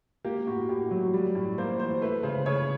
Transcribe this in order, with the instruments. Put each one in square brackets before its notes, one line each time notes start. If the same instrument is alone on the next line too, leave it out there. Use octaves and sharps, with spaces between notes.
[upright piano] A#3 G4
A2 F#4
A2 G4
F#3
G3
A2
A#3 C5
E3 C5
A3 B4
C#3 C5
C#3 C#5